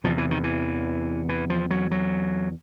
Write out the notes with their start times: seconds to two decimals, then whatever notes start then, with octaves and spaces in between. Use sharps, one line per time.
0.04 E2 C3 F3
0.18 E3
0.31 D#3
0.44 E3
1.29 E3
1.50 F3
1.71 F#3
1.91 F#3